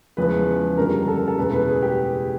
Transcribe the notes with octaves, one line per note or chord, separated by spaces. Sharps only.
E2 C#3 F3 G#3 B4
F#1 F#2 D3 G3 A#4
A4
A#4
A4
F#1 E2 B2 G#3 B4
B4
G#4
G4